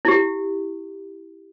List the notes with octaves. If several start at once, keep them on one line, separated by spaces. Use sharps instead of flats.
E4 G4